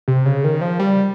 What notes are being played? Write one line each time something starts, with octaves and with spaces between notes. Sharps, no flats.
C3
C#3
D#3
F3
G3